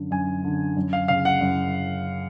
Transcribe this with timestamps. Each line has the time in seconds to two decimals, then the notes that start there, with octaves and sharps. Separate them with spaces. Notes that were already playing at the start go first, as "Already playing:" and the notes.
Already playing: F#2 D3
0.11 F#2 G#5
0.44 D3
0.77 F#2
0.93 F5
1.08 C#3 F5
1.25 F#5
1.41 F#2